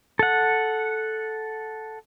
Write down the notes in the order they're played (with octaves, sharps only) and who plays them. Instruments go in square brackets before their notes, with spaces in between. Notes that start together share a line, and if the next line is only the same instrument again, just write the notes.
[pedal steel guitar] A4 F#5